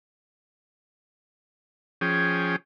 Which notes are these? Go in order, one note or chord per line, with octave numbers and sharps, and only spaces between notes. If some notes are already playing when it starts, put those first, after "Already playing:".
F3 C#4 G#4 G5